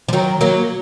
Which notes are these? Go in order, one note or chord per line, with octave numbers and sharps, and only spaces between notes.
F3
D#3 F#3
F#3 A#3